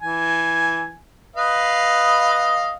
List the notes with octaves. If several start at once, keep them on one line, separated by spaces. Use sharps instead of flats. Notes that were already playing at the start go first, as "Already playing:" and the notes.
E3 G#5
B4 D#5 F5